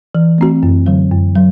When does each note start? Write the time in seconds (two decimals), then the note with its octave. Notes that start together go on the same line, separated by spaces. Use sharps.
0.15 E3
0.38 A3 C4 F#4
0.63 F#2
0.86 D3 F#3
1.11 F#2
1.35 F#3